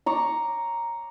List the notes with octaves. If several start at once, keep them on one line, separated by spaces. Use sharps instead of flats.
A#5 C#6 D6